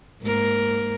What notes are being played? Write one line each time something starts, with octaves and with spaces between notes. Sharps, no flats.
G#2 A#3 A#4